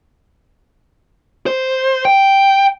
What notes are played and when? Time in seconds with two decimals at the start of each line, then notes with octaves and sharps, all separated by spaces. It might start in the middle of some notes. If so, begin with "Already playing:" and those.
1.46 C5
2.05 G5